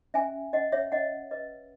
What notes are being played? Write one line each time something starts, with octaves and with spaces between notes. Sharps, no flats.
C#4 E5 G#5
C#4 D#5 F#5
C#5 E5
C#4 D#5 F#5
B4 D#5